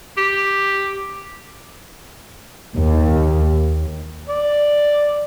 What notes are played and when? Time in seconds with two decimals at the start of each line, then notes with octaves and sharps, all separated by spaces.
0.17 G4
2.77 D#2
4.29 D5